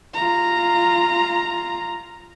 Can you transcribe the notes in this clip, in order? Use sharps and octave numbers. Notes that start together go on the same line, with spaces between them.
F4 A#5